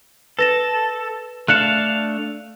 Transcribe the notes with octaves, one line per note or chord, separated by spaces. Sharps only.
A4 B4 A#6 E7
A3 D4 F5 F#6 C#7 E7